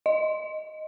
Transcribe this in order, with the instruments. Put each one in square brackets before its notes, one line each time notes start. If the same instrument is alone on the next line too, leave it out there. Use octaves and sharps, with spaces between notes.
[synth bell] D#5